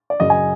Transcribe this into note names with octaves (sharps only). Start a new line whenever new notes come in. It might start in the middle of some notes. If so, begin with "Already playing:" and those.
D5
F#2 C#3 F#3 D#5
G#5